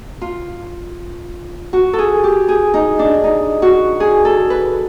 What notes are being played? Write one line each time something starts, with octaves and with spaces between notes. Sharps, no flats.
F4
F#4
A4
G#4
G4
G#4
D#4
D4
D#4
F#4
G#4
A4
B4